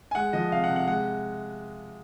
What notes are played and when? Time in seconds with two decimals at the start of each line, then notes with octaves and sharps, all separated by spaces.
0.11 G#5
0.15 G#3 F#5
0.33 F3 D#5
0.52 C3 F5
0.64 F#5
0.70 C3
0.76 F#5
0.87 G#3 F#5